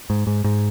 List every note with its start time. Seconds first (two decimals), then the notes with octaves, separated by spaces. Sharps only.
0.10 G#2
0.27 G#2
0.44 G#2